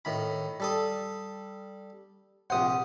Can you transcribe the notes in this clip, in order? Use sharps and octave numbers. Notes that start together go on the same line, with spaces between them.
A2 D#3 B5
G3 A4 D#6
A#1 C3 C5 F#5 D#6